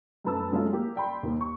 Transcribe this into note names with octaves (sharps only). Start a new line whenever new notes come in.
F#2 A3 B4 A5 E6
F#3 G#3 A3 C#4 F4 G#4
A#3 G4
D5 G5 B5 C6
D#2 A#3
C#6